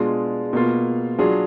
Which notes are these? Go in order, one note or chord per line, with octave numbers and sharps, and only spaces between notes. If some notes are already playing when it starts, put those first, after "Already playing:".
Already playing: B2 G#3 D4 F4 G#4
B2 A#3 F4
F#3 D4 F4 G#4